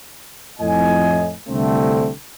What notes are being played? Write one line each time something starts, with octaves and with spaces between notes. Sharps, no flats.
F2 A2 D#5 G#5
C2 D3 A3 C4